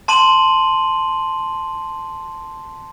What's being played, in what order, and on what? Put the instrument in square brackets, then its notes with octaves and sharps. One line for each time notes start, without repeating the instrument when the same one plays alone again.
[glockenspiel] A5 C6 D#7 F#7